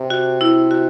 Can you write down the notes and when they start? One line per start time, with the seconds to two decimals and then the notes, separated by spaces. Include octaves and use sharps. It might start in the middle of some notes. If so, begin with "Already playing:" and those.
Already playing: C3
0.10 F#4
0.41 E4
0.71 F#4